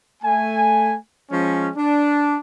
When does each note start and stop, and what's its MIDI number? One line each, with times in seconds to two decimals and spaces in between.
0.23 0.94 57
0.23 0.94 80
1.31 1.69 53
1.31 1.69 56
1.31 1.69 61
1.77 2.38 62